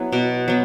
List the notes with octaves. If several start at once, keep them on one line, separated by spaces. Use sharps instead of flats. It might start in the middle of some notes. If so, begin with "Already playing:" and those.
Already playing: F#3 B3 E4
B2
F#3 B3